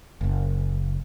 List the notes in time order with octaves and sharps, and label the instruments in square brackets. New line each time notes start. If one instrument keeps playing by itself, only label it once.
[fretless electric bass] F#1